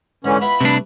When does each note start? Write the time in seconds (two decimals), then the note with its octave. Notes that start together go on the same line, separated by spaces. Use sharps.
0.24 G#2 D3 E3 C#4
0.41 B3 E4 F4 B5
0.61 C3 G3 A3 D4 B4